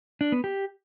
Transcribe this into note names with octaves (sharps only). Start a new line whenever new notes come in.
D4
B3
G4